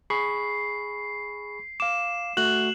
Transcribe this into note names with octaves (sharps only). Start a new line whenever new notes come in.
G#4 B5 C#6 C7
F5 D6 E7
A3 F#4 F#6 F#7